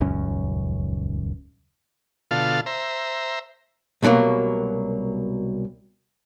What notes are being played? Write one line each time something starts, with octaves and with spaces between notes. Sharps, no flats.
D#1 C#2 F#2 C#4
B2 D3 F4 A4 F5
C5 E5 A#5
C2 B2 F#3 G#3 A#3